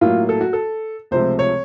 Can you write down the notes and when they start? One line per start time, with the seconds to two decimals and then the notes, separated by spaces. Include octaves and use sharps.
0.01 A2 F#3 A#3 F4
0.29 A4
0.41 F#4
0.53 A4
1.11 C#2 C3 F3 A3 C5
1.39 C#5